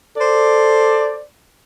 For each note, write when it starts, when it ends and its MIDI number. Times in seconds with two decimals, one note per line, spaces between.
0.17 1.19 69
0.17 1.21 72
0.17 1.21 74